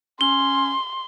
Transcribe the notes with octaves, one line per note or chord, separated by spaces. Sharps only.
C#4 C6 G7